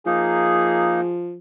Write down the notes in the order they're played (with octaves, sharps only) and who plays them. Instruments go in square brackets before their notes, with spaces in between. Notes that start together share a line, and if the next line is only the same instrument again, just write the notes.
[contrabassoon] F3 [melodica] A#3 D#4 [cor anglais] G#4